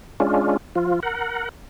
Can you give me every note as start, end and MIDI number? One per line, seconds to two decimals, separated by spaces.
0.20 0.57 56
0.20 0.57 61
0.20 0.57 62
0.20 0.57 65
0.75 1.00 53
0.75 1.00 65
1.03 1.49 70
1.03 1.49 78